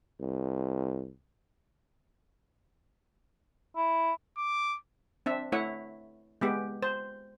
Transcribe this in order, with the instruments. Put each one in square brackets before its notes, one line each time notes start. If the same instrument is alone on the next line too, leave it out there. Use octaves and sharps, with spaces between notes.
[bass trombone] C2
[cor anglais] E4
[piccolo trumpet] D6
[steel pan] C4 D4 E5
A3 E4 C#5 F#5
G#3 B3 G4
C5